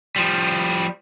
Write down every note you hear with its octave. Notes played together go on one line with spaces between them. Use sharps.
F3 G3